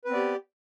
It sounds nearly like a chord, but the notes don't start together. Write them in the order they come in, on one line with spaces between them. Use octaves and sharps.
B4 C4 B3 D5 G4